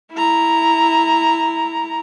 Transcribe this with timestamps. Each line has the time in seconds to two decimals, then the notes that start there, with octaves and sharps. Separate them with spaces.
0.13 E4 A#5